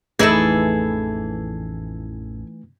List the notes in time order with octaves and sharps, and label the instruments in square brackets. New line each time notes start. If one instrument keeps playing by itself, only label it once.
[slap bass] A1 F2 [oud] E3 D#4 E4 [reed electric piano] A3 [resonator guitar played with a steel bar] G#4 A4